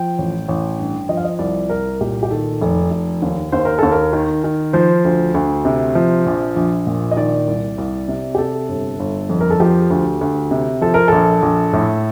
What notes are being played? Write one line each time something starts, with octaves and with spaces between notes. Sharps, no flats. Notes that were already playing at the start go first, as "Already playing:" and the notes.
Already playing: F3 G5
A1
A1
G2
F3 D#5
F5
D#5
C2 D5
C2 A#4
A#2 G4
G4
D#3 A4
F1
F1
D#2
D#2 C5
A#4
D#2 A4
A#4
D#3
D#3
F3 C5
D2
D2
C3
F3
A#1
A#1
A#2
D#5
D#3 D5
C2
C2
C3
G4
C3 A4
G1
G1
F2
A#4
A4
F3 G4
D2
D2
C3
F3 A4
A#4
A#1 A4
A#1
A2